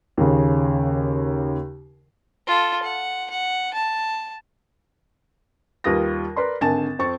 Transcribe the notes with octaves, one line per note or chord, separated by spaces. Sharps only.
D#2 C#3
F4 A4
F#5
F#5
A5
D#2 G3 F4 B4 D#6 A#6
A#4 B4 D5 C6
G#1 D3 G#5 A5 A6 E7
F2 C4 G5 C#6 A6